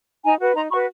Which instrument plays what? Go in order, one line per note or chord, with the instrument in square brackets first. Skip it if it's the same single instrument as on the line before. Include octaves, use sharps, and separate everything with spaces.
[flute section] D#4 G#5 A#5
F#4 B4
D#4 A#5 C6
F#4 B5 C#6
B4